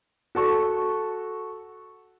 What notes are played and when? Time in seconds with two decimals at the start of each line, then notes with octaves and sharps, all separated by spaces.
0.35 F#4 A4 C#6